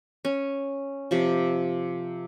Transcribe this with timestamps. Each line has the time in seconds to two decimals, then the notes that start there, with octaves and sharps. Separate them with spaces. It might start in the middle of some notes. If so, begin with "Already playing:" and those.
0.25 C#4
1.11 C3 F3